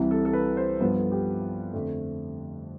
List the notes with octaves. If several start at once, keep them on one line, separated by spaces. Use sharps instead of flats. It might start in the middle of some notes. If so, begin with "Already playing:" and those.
Already playing: C2 C3 E3
A4
A4
B4
C5
G2 F3 B3 B4
A4
G4
F2 D3 A3